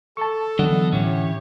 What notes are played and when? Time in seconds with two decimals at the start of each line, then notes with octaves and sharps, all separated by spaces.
0.17 A4 A5 C#6
0.59 D3 E3 F#3 B3 D#5 F#5
0.93 A2 E3 C#4 E4 G4 C#5